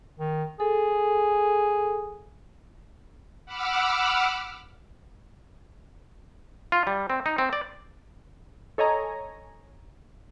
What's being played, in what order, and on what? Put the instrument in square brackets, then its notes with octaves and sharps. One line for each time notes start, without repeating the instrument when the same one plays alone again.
[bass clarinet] D#3
[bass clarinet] G#4 [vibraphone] A4
[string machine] F#5 B5 D6 E6 F6
[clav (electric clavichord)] F4
G3
C4
D#4
C4
D5
[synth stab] A4 C#5 D#5 G#5 A#5